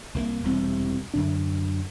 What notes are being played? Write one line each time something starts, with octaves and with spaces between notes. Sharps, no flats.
C2 G#3 A#3
E1 C2 C4
F#2 D3 D4